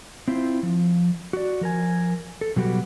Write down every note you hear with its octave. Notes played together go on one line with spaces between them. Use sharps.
C4 E4 F4 C5
F3
F#4 D5
F3 A#4 G#5
A4
B2 F#3 G3 F#4 G4 B4